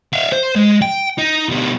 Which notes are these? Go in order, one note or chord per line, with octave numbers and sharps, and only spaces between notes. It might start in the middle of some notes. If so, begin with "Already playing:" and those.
E5 F5
C5
G#3
G5
D#4
B2 G3